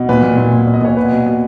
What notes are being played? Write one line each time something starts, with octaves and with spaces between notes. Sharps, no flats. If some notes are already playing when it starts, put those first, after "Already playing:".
Already playing: B2
A#2 B4
A#2
A#2
A#2
A#2
D#5
A#2 C#5
B2 B4
B2
B2